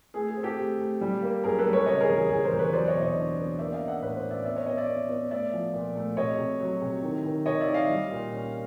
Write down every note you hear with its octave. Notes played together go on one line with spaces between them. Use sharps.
A3 G#4
G#4
C4
G4 A4
A3
A3
G3
A#3
F#2 G#4 A#4
A4 B4
G3
B4 C#5
C#3 C#5 D#5
G#4 A#4
E2
G#4
E2 G#4
A#4 C5
E2
B4 C#5
F#3 C5 D5
C#5 D#5
B2
C#5 D#5
D4
B3
A#3 D5 E5
D#5 F5
C#4
E5 F#5
A2 B4 C#5
C5 D5
C#4
D5 E5
B3 D5 E5
C#5 D#5
B3 C#5 D#5
D5 E5
B3
B3
A3 D5 E5
F3
A#2
A3
C3 C#5 D#5
C3
F#3
C3
D#3
D#3
C3 C#5 D#5
D5 E5
D#3
D#5 F5
G3
A#2
C#4